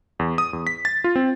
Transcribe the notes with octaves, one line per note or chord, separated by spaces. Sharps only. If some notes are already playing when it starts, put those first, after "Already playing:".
E2
D#6
E2
B6
A6
F4
C4